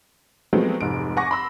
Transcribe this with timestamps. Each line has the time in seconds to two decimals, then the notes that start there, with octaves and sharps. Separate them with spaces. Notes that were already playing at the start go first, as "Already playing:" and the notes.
0.53 F3 F#3 G#3 A3 B3 C4
0.81 F1 G#2 D7
1.17 F#5 G#5 C#6 D6 A#6
1.31 B5 C6 E6